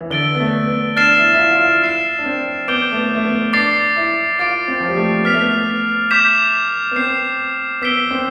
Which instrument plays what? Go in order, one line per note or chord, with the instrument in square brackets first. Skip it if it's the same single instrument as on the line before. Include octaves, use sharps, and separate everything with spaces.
[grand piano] E3
[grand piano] D3 [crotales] E6 A6 D7 G7
[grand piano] B3
A3
B3
[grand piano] D4 [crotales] F6 A6 C7 E7
[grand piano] E4
E4
F4
F4
E4
[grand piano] E4 [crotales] F6 C7 E7
[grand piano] D4
C4
[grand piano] B3 [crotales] D6 G6 D7 G7
[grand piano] A3
B3
A3
B3
[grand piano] D4 [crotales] D6 A6 C7
[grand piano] E4
[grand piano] F4 [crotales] D6 A6 D7
[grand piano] C4
F3
G3
A3
[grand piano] B3 [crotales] F6 B6 F7
[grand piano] A3
B3
[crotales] D6 G6 B6 E7
[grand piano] B3
[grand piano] C4 [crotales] G6 C7 E7
[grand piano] B3 [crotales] E6 B6 D7 G7
[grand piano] C4